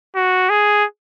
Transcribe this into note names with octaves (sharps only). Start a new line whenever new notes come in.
F#4
G#4